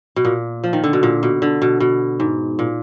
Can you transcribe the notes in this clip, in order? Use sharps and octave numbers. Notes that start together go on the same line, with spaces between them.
B2
A#2
F3
D#3
D3
B2
A#2
B2
D3
B2
B2
G#2
A#2